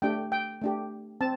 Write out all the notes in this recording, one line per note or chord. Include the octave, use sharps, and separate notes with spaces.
A3 D4 G4 G5
G5
A3 D4 G4
C4 A5